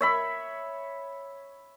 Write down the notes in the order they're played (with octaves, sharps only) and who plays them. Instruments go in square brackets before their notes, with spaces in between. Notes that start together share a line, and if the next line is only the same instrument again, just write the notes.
[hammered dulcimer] C#5 E5 B5